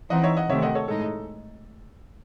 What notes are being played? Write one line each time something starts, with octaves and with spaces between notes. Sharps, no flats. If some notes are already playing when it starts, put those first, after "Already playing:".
E3 C4 D#4 D#5 F#5
C#5 E5
D#5 F#5
C3 D#3 A3 C4 C#5 E5
D#5 F#5
A4 C#5
A2 G#3 D#4 A4